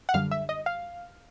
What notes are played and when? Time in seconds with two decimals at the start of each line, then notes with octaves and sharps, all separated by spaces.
0.09 F#5
0.14 F#2 D3 G3 F5
0.31 E5
0.49 D#5
0.66 F5